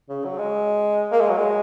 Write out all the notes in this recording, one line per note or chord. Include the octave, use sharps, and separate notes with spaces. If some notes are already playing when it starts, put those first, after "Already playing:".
C#3
F#3
G#3
A#3
G#3
F#3
G#3